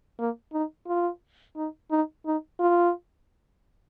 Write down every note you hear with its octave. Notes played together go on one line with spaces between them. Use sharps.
A#3
D#4
F4
D#4
D#4
D#4
F4